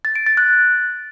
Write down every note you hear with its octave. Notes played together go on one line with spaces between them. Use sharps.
A6
D7
A6
F#6